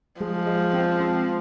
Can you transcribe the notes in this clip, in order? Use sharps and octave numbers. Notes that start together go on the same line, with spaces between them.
F3 G#3
G#3
C4
C4